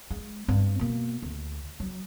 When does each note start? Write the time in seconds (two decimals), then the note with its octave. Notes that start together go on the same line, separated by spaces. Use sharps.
0.10 G#3
0.48 G2 C4
0.79 B2 A#3
1.22 D2
1.80 F#3